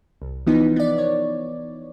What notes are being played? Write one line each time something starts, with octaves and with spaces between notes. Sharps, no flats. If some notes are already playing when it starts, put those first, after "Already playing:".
C2
E3 F3 B3 D#4
B3 D5
C#5